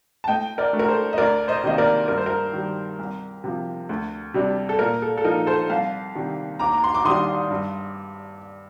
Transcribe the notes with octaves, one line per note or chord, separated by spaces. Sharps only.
A5
A2 D#5 G5
A#4 D5
A3 D4
A#4
A4 C5
D#5
D2 A#4 D5
C5 D#5
C3 D#3 A#3 D#5
A#4 D5
G2 A#4
C5
A#4
D#3 G3
C2
C3 F3
D2
C3 G3 D4
A4
A#2 A#4
A4
A4
F3 A#3 D#4 A#4
A4 C5
C2 F5 A5
C3 D#3 G3
D#2 A#5 D6
A#5
C6
D6
D#3 G3 D4 C6 D#6
G2